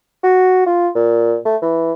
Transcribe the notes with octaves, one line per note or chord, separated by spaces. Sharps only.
F#4
F4
A#2
A3
E3